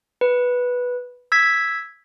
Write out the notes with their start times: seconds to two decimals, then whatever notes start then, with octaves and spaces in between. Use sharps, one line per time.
0.21 B4
1.32 E6 G#6 B6